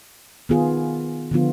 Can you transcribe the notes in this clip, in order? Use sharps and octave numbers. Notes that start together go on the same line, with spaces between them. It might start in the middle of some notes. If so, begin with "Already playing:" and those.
D#3 B3 F4 G#4
D3 F3 B3 F4